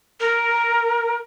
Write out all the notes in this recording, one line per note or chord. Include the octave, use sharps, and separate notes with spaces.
A#4